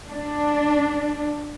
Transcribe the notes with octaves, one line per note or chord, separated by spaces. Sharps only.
D4